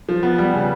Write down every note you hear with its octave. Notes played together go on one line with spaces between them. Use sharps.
F3
B3
G3
C#3